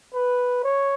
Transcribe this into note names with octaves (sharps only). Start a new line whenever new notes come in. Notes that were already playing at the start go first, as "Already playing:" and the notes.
B4
C#5